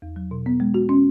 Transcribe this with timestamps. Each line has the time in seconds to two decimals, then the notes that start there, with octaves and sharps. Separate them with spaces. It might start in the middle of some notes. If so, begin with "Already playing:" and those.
0.02 E2
0.16 F#3
0.31 B2
0.46 B3
0.60 G#3
0.74 F#4
0.89 C#4